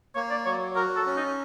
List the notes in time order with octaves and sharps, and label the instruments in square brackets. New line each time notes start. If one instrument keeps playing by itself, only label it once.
[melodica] A#3 [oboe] C#5
[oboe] D5
[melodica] F#3 [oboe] C#5
[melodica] F#4 [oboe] A#4
[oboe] A4
[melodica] C#4
[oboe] D#4